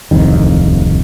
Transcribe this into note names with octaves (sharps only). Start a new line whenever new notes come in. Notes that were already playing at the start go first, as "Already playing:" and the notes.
D1 C2 F2 D#3